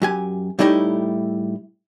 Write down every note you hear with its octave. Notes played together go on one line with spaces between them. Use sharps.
F#2 G4 G#5
A2 G3 A3 D#4 E4 G4